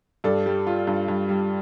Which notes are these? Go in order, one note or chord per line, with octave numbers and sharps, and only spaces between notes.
G2 A4 D5
G3
F4
G2
G2
G3